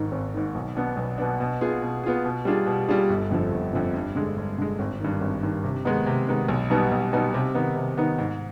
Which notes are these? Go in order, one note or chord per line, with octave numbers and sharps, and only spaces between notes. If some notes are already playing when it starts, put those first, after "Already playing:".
Already playing: G#1 G#2 D#3
G#1
G#2 D#3
B1
B2 B3 D4
B1
B2 B3 D4
B2
B3 F4 G#4
B2
B3 F4 G#4
B2
G3 D4 F4 G#4
B2
G3 D4 F4 G#4
G1
F2 D3 F3
G1
F2 D3 F3
G2
D3 G#3
G2
D3 G#3
G#1
G2 D#3
G#1
G2 D#3
C3
D#3 G#3 B3 D#4
C3
D#3 G#3 B3 D#4
B1
B2 G3 B3 D#4
B1
B2 G3 B3 D#4
C3
D#3 B3 D#4
C3
D#3 B3 D#4
G#2